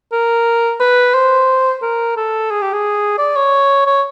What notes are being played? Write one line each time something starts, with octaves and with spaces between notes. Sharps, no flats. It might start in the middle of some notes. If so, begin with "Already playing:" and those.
A#4
B4
C5
A#4
A4
G#4
G4
G#4
D5
C#5
C#5